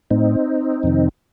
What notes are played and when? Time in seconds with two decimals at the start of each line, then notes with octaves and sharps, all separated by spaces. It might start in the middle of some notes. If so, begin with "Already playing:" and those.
0.10 A2 C4 D#4
0.83 F2 C3 D#3